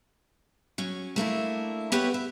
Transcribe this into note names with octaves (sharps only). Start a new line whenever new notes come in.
F#3 C#4
A3 A#3 D4 E4
B3 G4 B4 C#5 E5 F#5
E5